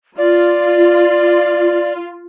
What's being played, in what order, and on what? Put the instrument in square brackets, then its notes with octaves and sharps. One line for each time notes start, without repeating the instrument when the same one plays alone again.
[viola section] F4 [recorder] D5